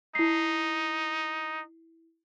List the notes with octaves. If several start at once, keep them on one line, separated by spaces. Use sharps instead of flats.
D#4 E4 C7